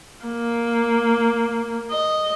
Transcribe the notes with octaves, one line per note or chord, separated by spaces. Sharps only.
A#3
D#5